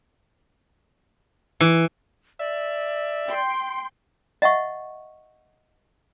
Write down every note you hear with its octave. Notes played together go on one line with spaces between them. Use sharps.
E3
D5 E5
G5 C6
D#5 E5 F#5 C#6